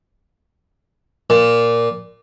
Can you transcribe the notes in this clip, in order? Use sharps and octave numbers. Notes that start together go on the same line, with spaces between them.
A#2